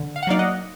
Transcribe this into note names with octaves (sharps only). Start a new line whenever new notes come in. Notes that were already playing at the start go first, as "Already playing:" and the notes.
Already playing: D3
F5
F#5
F#3 A#3 D#4 D5 F5
D#5 F#5